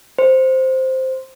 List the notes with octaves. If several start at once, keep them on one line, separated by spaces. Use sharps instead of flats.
C5